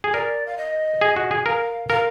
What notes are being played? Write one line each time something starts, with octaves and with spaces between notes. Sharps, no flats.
G#4
A#4 D5
F5
D#5
G#4
F#4
G#4
A#4 F5
A#4 F5